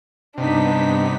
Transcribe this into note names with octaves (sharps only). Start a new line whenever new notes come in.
G2 C3 B3 D4 D#4 B6